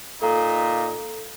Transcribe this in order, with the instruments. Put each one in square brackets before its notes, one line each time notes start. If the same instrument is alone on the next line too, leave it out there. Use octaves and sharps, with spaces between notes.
[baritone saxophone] A#2 [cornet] D#4 [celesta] A4 A#5